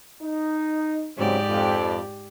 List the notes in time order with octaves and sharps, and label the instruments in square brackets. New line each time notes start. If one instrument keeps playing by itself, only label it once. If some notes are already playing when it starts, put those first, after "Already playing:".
[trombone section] D#4
[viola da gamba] G#2 G4 D5 [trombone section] C#3 F#3 C4
[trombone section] F2